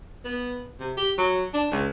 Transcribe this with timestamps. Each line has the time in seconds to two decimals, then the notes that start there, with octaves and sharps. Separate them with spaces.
0.25 B3
0.80 C3
0.97 G4
1.18 F#3
1.54 D4
1.71 C#2